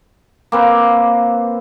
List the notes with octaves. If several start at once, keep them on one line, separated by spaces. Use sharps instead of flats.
A#3 C4 B4